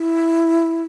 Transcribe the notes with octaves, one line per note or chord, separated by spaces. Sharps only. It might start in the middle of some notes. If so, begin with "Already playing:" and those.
Already playing: E4